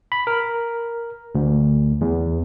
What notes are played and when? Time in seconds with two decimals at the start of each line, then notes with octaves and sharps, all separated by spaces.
0.12 B5
0.27 A#4
1.35 D2
2.01 E2